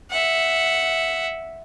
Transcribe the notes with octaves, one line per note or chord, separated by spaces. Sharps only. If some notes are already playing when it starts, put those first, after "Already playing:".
E5 F#5